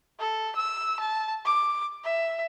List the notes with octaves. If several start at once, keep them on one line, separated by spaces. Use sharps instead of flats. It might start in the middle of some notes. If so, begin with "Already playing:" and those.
A4
E6
A5
D6
E5